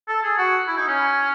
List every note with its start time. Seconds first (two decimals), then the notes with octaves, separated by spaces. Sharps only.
0.08 A4
0.23 G#4
0.37 F#4
0.67 E4
0.77 D#4
0.87 C#4